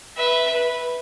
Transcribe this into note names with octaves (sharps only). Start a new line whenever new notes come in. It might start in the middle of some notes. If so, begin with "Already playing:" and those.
B4 E5
B4